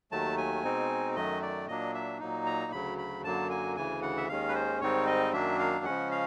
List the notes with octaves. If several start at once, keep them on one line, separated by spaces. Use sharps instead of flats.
D#2 D#3 F#3 A3 A5
G#5
B2 G#3 C4 D#4
F#2 D#3 F#3 A3 D#5
D5
A#2 F#3 A#3 D4 D#5
E5
A#2 F#3 A#3 D#4
A#5
D2 C#3 F#3 B5
B5
F#2 D3 F#3 A#3 A5
G#5
D2 C#3 E3 G#5
F#5
E5
D#2 D#3 G#3 C#4 F5
B4
C5
G#2 D#3 G3 C4 D#4 C#5
D#5
F#2 D#3 F#3 A#3 D4 E5
F5
C#3 F3 G#3 C#4 F#5
F5